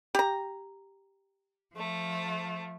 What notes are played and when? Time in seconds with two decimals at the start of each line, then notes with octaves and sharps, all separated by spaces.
0.15 G4 A#5
1.75 F3 A3